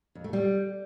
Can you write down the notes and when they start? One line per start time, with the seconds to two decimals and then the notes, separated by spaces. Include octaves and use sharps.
0.15 F2
0.24 A3
0.33 G3